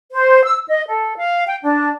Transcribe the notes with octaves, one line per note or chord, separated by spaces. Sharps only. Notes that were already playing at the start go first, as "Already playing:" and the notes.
C5
E6
D#5
A4
F5
G5
D4